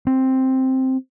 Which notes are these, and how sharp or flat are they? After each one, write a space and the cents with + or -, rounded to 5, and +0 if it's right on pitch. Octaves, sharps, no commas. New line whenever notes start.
C4 +5